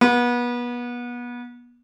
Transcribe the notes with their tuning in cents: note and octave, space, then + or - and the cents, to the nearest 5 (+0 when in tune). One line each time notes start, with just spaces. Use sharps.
B3 -30